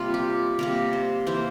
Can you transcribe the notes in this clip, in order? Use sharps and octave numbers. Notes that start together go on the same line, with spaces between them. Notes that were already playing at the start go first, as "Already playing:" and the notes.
Already playing: C3 G3 A#3 F4
G4
C3 G3 A#3 A#4
C5
E3 A#3 C5